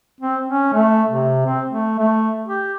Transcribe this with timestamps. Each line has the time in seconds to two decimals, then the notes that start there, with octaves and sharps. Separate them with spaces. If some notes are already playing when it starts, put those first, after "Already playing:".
0.20 C4
0.49 C#4
0.73 A3
1.08 C3
1.47 C4
1.68 A3
1.99 A3
2.48 G4